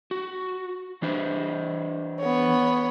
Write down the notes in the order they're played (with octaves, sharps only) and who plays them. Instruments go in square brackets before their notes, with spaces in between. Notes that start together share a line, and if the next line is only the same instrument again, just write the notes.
[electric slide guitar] F#4
E3 D4 C5
[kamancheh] B3 C#5